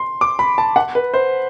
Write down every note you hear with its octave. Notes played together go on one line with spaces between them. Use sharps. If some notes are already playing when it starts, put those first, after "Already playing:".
Already playing: C6
D6
B5
A5
F#5
B4
C5